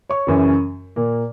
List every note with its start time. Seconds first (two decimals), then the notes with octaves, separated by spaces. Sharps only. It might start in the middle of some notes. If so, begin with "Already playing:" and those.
0.09 C#5 C#6
0.27 F#2 C#3 E3
0.96 A#2 A#3